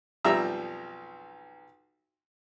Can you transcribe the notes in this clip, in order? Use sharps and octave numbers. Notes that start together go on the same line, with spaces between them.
B1 F2 G3 E5 A#5 E6